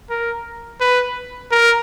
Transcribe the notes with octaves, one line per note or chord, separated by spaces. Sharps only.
A#4
B4
A#4